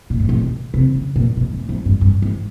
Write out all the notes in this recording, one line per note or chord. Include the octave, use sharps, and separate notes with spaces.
A#2
A2
A#2
B2
C3
C#3
A#2
B2
A2
G#2
G2
G2
G#2